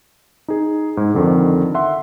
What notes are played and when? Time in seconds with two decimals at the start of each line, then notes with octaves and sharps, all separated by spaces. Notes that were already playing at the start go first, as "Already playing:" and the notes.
0.48 D#4 G#4
0.97 G#2
1.14 F2 D3 D#3
1.75 E5 F#5 C6